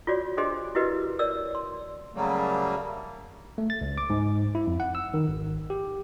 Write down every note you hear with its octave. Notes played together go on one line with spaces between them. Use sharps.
F4 F#4 C#5 D5
D4 G4 G#4 C5 D#5 C6
E4 F#4 G4 A#4 B4 D#5
A#4 C#5 D5 E6
C6
C#3 F#3 G3 A3 A#3
A3
A6
C#2
D6
G#2
E4
F2
F#5
E6
D#3
G#1
G4